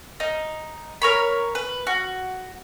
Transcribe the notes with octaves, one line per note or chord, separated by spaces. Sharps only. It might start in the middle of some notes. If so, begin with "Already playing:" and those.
D#4
A#4 C#5 B5
B4
F#4